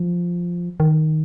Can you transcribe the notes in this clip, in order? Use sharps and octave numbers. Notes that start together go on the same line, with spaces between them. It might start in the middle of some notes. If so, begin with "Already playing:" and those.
Already playing: F3
D#3